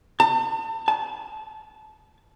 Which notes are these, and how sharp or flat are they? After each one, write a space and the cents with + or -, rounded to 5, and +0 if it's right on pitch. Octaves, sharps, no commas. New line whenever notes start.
A5 +35
A5 -30